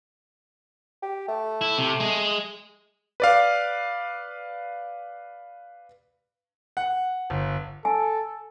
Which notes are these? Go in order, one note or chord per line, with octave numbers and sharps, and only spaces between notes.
G4
A3
E4
C3
G#3 G#4
B4 D5 F5
F#5
G1
A4 G#5